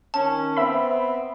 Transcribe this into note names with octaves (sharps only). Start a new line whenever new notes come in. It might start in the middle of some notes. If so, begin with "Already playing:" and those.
D#3 C#4 A5
B3 C4 E5 B5